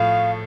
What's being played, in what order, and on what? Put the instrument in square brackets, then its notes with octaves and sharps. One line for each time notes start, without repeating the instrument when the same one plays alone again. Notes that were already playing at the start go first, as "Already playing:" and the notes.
Already playing: [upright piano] A2 F3 A3 [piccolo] F5